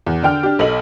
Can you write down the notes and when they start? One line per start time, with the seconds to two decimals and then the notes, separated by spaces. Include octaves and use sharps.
0.06 E2
0.22 D3 D4 G5 F6
0.43 D4 G4
0.59 B1 A4 D#5 F#7